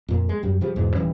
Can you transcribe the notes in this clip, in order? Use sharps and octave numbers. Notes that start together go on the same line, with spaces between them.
F2 A#2
G#3
F#2 G3
C#3 F3 G3
E2 G#2 B2
D#1 E3 G3 C#4